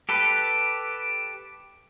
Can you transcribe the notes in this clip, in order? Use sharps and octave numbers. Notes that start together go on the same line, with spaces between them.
G4 A4 B4